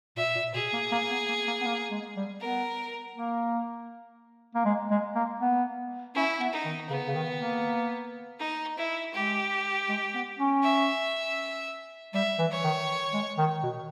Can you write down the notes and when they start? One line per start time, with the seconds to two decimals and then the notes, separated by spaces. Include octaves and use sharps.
0.16 A#2 E5
0.35 A#2
0.54 B2 G#4
0.73 A#3
0.92 A#3
1.11 B3
1.28 A#3
1.47 A#3
1.61 B3
1.66 A#3
1.91 G#3
2.16 G3
2.40 B3 A#4
3.16 A#3
4.55 A#3
4.65 G#3
4.91 G#3
5.15 A#3
5.40 B3
6.15 C#4 E4
6.40 B3
6.53 D#4
6.65 D#3
6.89 C#3 B3
7.08 C#3
7.15 D#3
7.39 A#3
8.39 D#4
8.77 E4
9.14 G#3 G4
9.89 G#3
10.14 B3
10.39 C#4
10.63 E5
12.14 G3 E5
12.39 E3
12.51 C#5
12.64 D#3
13.13 G#3
13.38 D#3
13.63 B2